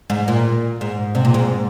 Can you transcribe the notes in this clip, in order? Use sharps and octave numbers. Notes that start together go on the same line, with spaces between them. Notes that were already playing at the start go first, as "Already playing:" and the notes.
G#2
A#2
G#2
C3
A#2
G#2